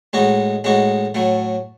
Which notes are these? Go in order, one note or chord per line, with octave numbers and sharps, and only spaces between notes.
A2 G#3 D#4 F#4
A2 G#3 D#4 F#4
A2 F#3 A3